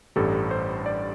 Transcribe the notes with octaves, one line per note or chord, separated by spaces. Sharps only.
A1 G2 G3 A4
C5
D5